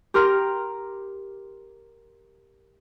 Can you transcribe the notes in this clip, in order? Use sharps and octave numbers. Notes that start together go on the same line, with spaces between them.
G4 A#4 C6 F6